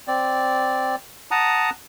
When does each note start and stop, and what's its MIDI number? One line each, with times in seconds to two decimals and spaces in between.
0.07 0.96 60
0.07 0.96 74
1.31 1.70 78
1.31 1.70 81
1.31 1.70 82
1.31 1.70 87